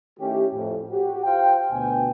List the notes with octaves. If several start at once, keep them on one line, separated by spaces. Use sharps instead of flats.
D#3 A3 C#4 E4 G4
F2 A2
F#4 G4
F4 G4 C5 F5 G5
D2 B2 G5 G#5